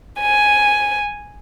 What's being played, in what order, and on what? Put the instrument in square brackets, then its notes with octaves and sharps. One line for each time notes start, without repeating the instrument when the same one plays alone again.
[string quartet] G#5